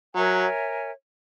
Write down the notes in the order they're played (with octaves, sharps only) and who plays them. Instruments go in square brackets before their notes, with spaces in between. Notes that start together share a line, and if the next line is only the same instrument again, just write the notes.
[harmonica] F#3 [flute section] A#4 C#5 E5 G#5